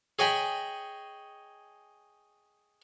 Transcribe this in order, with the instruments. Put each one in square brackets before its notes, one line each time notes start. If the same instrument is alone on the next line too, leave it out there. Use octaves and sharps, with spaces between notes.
[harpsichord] G#4 C#5 D#5 G5 G#5 B5